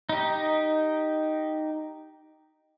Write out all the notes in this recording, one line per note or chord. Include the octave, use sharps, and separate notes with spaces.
D#4 G4